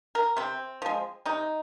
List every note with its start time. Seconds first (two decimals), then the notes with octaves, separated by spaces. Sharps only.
0.15 A#4
0.37 C3 C4
0.82 F3 G#3
1.25 C3 D#4